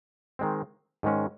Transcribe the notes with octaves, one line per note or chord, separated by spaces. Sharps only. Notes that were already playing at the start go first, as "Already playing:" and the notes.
D#3 G#3 C4
G#2 D#3 G#3 C#4